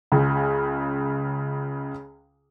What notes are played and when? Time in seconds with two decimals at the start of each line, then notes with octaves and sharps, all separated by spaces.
0.12 C#2 C#3